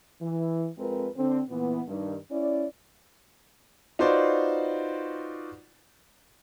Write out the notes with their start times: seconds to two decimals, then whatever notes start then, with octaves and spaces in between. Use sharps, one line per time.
0.21 E3
0.78 F2 G#3 C4 F4 A#4 B4
1.16 D3 C4
1.50 A#2 E3 B3
1.87 G2 D#3
2.31 C#4 E4 D5
3.99 D#4 F4 F#4 B4 C5 D5